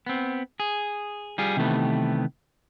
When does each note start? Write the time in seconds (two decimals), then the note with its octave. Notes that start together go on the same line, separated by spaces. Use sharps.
0.06 B3 C4
0.60 G#4
1.38 G3 F4 G#4
1.57 C3 D#3 E3 G3 A3 B3